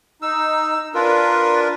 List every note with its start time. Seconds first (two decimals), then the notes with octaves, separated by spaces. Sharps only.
0.22 D#4 E6
0.94 D4 F4 A#4 B4